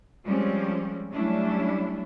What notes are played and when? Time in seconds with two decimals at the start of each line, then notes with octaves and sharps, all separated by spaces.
0.25 F3 G3 G#3 C4 C#4
1.10 F#3 G3 A3 C#4 D4 E4